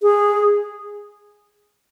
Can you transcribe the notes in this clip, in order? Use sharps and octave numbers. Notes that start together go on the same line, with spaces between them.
G#4